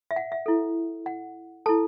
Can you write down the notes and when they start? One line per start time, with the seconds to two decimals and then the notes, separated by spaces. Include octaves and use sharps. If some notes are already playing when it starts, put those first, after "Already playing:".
0.11 E5
0.16 F#5
0.32 E5
0.46 E4 A4
1.06 F#5
1.66 E4 A4 A5